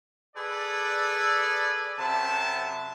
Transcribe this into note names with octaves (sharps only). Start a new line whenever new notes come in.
G#4 A4 B4 D5
F#2 C3 E5 A5